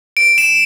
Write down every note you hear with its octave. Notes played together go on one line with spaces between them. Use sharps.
D7
E7